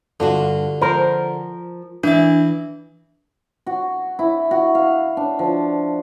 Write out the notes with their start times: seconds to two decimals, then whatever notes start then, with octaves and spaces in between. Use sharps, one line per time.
0.20 G2 D3 F4 F#4
0.81 F3 A#4 C5
2.04 E3 D4 E4 E5
3.66 F#4
4.19 E4
4.51 F#4
4.75 F5
5.17 D4
5.39 F3